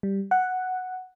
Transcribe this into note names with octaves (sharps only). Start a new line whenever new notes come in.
G3
F#5